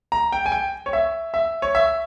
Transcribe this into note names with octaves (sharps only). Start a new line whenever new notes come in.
A#5
G5
G#5
G5
C#5
E5
E5
C#5
E5